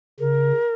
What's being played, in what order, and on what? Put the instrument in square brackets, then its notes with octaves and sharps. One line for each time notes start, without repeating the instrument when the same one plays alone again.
[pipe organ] C#3 [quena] A#4